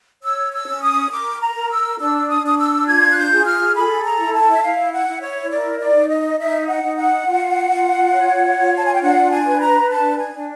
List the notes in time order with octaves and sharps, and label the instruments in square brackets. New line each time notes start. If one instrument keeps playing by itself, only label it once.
[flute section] C#5 E6
E6
C#4
D#6
A#4 D6
A#5
A#4
E6
D4 E6
D#6
D4 D#6
E6
F4 G#6
F#6
G6
G#4
F6
A4 B5
A#5
E4
A5
E5
E4 F5
F#5
E4
C#5
A#4 D5
D5
D#4
D#5
D#4 E5
F#5
D#4
F#5
F4
F4
C#5
F4
A5
G#5
G5
D4 F#5
G#5
B4
A#5
D4 A5
G#5
D4